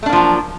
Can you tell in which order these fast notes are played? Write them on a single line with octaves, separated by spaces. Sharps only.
A3 D4 A#3 F3 F#3